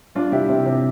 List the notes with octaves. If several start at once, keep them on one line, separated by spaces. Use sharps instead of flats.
G3 D4 F4
C3 E4 G4
C3
C3